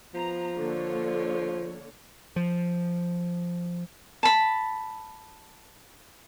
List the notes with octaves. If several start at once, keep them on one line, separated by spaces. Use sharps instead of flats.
F3 B3 A#5
D3 A#3 C#5
F3
A5 B5